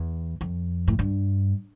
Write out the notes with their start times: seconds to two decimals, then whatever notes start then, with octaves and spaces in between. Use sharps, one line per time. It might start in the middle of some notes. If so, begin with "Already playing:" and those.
Already playing: E2
0.41 F2
0.88 A2
0.99 G2